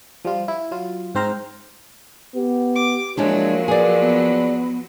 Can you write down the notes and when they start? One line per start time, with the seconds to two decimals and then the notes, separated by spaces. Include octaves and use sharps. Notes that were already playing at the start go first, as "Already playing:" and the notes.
0.25 F3 G3 F4
0.48 E4
0.71 F#3 F4
1.15 G#2 C4 C5 A#5 F6
2.35 B3 G4
2.74 D6
3.17 F3 F#3 G#3 A#3 D4 E4 C#5
3.68 G#4 B4 D5
4.01 B3